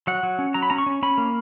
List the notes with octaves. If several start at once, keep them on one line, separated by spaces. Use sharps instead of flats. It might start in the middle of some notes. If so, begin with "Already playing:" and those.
F#3 F#5
F#3
C#4
F#3 A#5
B5
C#4 A#5
C#6
C#4
C#4 B5
A#3